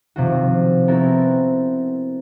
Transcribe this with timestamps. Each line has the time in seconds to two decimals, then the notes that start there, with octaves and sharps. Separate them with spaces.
0.16 C3 D#3 F3 F4 F#4
0.88 B3 C4 E4 F#4 A4 A#4